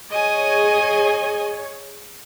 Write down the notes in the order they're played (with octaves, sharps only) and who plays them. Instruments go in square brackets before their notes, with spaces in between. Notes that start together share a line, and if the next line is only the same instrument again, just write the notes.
[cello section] G#4 C#5 [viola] D#5 G#5